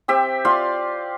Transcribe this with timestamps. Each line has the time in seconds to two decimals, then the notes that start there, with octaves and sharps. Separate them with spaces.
0.08 C4 G4 E5
0.45 F4 D5 F5 C6